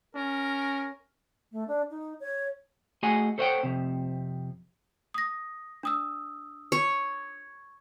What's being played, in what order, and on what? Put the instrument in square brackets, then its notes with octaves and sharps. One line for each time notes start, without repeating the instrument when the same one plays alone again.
[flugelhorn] C#4 [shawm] A#4
[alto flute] A3
D4
D#4
C#5
[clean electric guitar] A3 F#4 G#4 D#5 F#5 G#5
A4 C5 C#5 D#5 F#5 G5
F2 C3
[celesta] D#6 A#6
D4 D#6 E6
[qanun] C#5